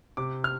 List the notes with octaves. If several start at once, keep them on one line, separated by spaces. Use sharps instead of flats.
C3 D6
F6